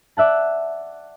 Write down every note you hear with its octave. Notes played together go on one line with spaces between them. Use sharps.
D5 E5 F#5 A5